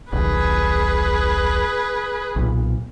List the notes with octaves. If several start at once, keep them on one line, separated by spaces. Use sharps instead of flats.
D#1 B1 G#4 B4
B1 A#2